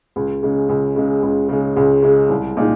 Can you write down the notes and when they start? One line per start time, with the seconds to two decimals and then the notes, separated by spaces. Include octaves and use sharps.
0.16 C#2
0.43 C#3 G#3
0.69 C#2
0.96 C#3 G#3
1.23 C#2
1.49 C#3 G#3
1.76 C#2
2.02 C#3 G#3
2.29 C2
2.57 A#2 G#3 D#4